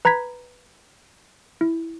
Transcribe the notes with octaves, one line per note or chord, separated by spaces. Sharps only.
B4 A#5 B5 G#6 B6
E4